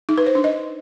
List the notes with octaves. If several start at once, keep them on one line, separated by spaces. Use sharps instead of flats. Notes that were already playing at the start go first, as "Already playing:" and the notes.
D#4
B4
C5
D4
D#5